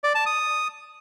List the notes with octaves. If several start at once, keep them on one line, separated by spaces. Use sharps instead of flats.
D5
A5
D#6